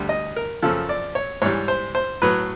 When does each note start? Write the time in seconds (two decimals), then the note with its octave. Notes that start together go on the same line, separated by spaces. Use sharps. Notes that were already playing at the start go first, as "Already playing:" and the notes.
Already playing: D2 D3 G3
0.09 D#5
0.36 A#4
0.63 F#2 C#3 F3 A4
0.89 D5
1.15 C#5
1.42 G#2 E3 G3 C#5
1.68 C5
1.95 C5
2.22 A2 F#3 B4